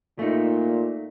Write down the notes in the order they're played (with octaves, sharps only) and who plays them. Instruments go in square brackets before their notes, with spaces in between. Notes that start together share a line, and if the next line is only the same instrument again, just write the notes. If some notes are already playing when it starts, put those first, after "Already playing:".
[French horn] A#2 [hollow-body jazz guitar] A3 D#4